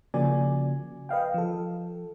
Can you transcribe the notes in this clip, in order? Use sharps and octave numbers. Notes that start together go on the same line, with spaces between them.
C#3 F3 A#3 F#4 D5 G#5
B4 D#5 F5 G5
F3 A4